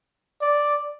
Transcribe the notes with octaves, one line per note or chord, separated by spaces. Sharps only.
D5